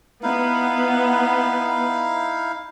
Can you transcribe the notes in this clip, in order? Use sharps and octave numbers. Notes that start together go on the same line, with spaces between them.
B3 D#4 E4 F5